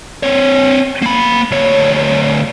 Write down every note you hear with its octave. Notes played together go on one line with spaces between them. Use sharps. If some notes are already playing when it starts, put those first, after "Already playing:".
C4 C#5
A#3 B5
D2 C#5